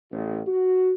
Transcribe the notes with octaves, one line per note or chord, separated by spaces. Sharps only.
A1
F#4